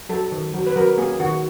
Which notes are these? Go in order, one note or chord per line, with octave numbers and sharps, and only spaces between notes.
F#3 A4
D#3
F#3
B4
F#3 A#4
A#3 G#4
D#3 F#4